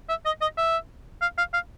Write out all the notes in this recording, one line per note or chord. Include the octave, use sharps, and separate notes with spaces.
E5
D#5
D#5
E5
F5
F5
F5